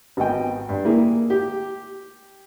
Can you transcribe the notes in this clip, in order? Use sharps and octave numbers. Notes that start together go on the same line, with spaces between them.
G#1 B3 D#5 G5
G2
A#3 E4 G#4
G4